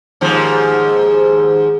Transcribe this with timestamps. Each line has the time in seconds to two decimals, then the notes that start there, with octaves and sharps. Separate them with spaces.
0.21 D#2 G#2 F3